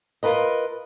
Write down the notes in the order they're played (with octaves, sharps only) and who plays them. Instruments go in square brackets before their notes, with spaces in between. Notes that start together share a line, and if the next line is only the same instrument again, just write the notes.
[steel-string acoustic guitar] F4 A#4 B4 D#5